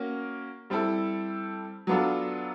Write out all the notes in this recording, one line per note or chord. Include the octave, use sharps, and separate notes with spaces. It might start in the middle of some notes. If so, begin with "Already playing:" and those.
Already playing: A#3 C#4 F#4 A#4
G3 C4 E4 A4
F#3 B3 D4 F4 A4